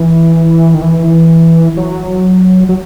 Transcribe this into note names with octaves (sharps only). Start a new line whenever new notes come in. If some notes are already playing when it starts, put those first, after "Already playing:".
Already playing: E3
D#3
E3
F#3
F#3